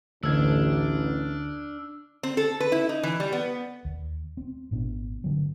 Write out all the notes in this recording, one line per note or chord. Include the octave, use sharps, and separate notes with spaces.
A1 D2 D4 E6 F6 G#6
C4
A4
B4
E4
D#4
E3
G3
B3
D#2
C4
G#1 A#2 B3 D4
G2 D3 F#3